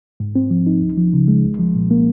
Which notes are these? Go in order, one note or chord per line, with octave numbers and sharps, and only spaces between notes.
G#2
C4
F3
D#4
C#2
F3
C#3
G#3
C2
F3
A#2
A#3